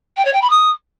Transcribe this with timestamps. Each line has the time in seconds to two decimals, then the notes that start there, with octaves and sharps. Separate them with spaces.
0.17 G5
0.25 C#5
0.33 G5
0.42 B5
0.50 D#6